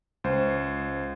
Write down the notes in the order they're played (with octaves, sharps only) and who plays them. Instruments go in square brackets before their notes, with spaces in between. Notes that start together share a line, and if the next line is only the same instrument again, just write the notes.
[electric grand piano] C#2 C5